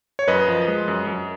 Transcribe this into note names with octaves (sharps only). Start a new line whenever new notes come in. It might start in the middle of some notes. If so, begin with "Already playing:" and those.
C#5
F#2 B4 D#5
F3
G#3
F#2
F#2